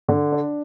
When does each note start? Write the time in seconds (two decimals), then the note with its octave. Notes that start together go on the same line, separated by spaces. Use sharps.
0.08 D3
0.32 D4